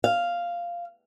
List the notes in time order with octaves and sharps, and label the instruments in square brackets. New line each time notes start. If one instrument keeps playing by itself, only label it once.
[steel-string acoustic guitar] F5